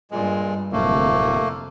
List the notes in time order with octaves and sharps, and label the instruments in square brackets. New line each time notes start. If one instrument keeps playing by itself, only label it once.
[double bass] G2 [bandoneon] A#2 G#3
[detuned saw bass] D1 [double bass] F2 C3 [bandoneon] A3 A#3